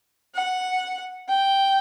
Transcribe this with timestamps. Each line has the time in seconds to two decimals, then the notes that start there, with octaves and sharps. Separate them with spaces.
0.35 F#5
1.29 G5